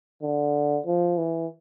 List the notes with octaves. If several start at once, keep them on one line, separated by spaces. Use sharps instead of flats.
D3
F3
E3